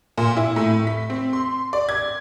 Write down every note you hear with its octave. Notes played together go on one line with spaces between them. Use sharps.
A#2
E4
A2
B6
C4
C6
D5
G#6